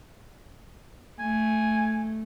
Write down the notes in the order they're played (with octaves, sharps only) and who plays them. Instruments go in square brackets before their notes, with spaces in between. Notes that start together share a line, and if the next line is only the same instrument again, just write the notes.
[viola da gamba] A3 [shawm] G#5